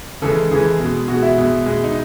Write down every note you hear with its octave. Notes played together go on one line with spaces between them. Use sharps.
C#3 E3 G#3 A4
C#3 E3 G#3 G#4
B2 G#3
B2 G#3 F#4
E4
B2 G#3
B2 G#3
D#4